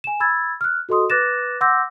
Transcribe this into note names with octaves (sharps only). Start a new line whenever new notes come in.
G#5 E7
B5 E6 G#6 A6
F6 F#6
F#4 A4 D#5 C6 D#6
B4 D6 F#6 A6 A#6 E7
F#5 C6 D6 E6 G6 A#6